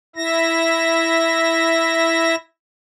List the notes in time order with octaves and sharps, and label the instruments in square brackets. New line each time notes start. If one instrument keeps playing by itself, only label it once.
[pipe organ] E4 E5 A#6